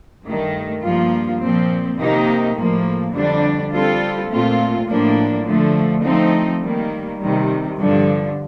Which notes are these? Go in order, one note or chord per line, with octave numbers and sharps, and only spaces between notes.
G2 D#3 A3
G2 F3 A#3 F4
A#2 F3 C4
C3 D#3 A#3 D#4 G4
A2 F3 A#3
F2 D3 G3 D4
G3 C4 F4 A4
A#2 A3 C4 F4
A2 F3 A#3 D4
D3 F3 A3
F3 A3 C4 D#4
D#3 G3 A#3
C3 D#3 G3
G2 D3 F3